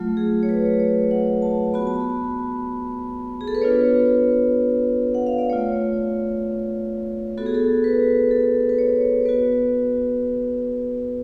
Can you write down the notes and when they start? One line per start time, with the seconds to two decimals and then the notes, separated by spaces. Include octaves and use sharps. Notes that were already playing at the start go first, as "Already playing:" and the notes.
Already playing: F#3 A3 F4
0.17 G#4
0.43 C#5
0.49 B4
0.80 C#5
1.11 F#5
1.42 A5
1.74 B3 F#4 B5
1.87 A5
2.00 B5
3.41 G#4
3.48 A4
3.55 B4
3.62 B3 D4 F4 C#5
5.15 F#5
5.26 F5
5.38 D5
5.50 A3 F4 C#5
7.37 B3 F#4 A4
7.46 G#4
7.54 A4
7.84 B4
8.31 A4
8.69 B4
8.79 C#5
9.26 B3 F#4 B4